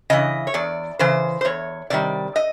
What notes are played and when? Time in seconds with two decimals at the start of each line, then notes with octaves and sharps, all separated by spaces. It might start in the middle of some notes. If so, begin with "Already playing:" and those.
0.10 C#3 E3 D#5
0.47 C#5
0.54 E2 D5
0.99 C#3 E3 C5
1.41 C5
1.45 E2 C#5
1.90 C3 D#3 G3 D5
2.36 D#5